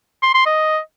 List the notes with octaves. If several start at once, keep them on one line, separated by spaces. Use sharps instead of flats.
C6
C6
D#5